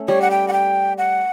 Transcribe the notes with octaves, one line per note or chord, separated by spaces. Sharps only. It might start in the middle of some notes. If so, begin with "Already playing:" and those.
Already playing: A3 C#4
G3 C#5
F#5
G5
F#5
G5
F#5